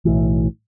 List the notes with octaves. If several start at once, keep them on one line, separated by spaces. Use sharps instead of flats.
B1 A2 E3